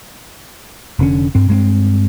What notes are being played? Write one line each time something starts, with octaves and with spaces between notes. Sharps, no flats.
F1 D3 C#4
G2 C4
G2 G#3 A3 C4